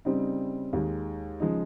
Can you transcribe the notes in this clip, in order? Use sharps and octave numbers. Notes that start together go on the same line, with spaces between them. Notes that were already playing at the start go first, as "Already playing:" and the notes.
C#3 G3 C4 D#4
D#2 D#3 G#3
C#3 F3 G#3 D#4